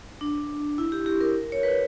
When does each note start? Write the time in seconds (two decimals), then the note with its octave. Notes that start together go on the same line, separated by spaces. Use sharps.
0.21 D4
0.78 E4
0.92 G4
1.06 G4
1.21 A#4
1.52 C#5
1.63 B4